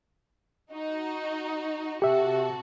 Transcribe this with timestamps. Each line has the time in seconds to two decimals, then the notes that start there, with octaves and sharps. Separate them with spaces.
0.73 D#4 F#4
2.02 C3 F#4 G4 A4 E5